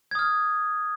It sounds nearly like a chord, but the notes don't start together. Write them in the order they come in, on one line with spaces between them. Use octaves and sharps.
G#6 D#6 F6